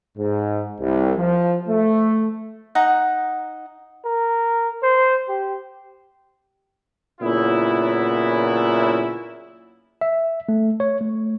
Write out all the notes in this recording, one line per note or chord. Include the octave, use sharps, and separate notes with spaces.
G#2
C2
F3
A3
D#4 F#5 A#5
A#4
C5
G4
A#2 C#3 F#3 B3 E4
E5
A3
C#5
A3